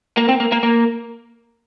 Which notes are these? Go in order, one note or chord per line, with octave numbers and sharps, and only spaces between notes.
A#3
C4
A#3
A#3
A#3